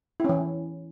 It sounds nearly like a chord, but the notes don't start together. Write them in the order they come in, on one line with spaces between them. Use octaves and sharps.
E4 C#4 E3